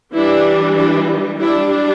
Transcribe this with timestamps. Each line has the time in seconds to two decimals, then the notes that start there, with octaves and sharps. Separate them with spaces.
0.14 E3 G3 D4 E4
0.78 D4
1.41 G3 D4 E4